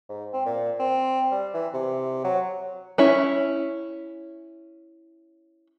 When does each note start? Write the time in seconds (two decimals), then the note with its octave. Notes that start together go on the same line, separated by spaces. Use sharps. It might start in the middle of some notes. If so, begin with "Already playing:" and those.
0.09 G#2
0.33 C4
0.46 A#2
0.80 C4
1.31 G3
1.54 E3
1.74 C3
2.24 F#3
2.98 C#4 E4